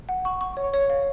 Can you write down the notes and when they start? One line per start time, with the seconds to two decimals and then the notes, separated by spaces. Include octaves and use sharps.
0.09 F#5
0.25 C#6
0.41 C#6
0.57 C#5
0.73 C#5
0.90 F5